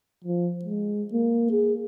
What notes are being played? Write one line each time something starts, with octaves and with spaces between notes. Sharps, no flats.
F3
G#3
A#3
G#4